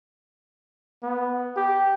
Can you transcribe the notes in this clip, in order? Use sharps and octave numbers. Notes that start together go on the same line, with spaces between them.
B3
G4